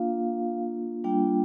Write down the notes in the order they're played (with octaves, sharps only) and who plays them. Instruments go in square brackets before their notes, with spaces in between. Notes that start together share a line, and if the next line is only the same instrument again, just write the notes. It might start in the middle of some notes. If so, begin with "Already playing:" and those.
Already playing: [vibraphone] A#3 D4 F4 F5
G3 A#3 D4 F4 G5